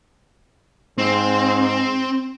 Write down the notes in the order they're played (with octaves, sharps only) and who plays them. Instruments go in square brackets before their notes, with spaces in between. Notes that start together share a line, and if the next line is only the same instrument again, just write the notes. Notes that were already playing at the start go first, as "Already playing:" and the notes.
[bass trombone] G#2 [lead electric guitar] C4